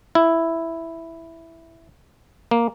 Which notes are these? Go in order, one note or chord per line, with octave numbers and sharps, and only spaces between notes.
E4
A#3